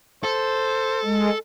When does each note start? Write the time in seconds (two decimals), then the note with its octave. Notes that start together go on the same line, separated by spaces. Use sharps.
0.24 A4 C5
1.05 G#3